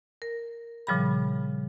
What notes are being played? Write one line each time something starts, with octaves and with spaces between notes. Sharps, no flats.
A#4
A#2 C#3 F3 G3 G#4 B5